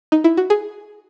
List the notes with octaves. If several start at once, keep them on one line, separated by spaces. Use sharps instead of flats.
D#4
E4
F#4
G#4